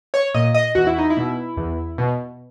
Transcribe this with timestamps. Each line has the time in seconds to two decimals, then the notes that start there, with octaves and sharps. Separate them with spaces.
0.14 C#5
0.34 A#2 D#5
0.54 D#5
0.75 E2 F#4
0.87 E4
0.98 D#4
1.10 E4
1.17 B2
1.57 E2
1.98 B2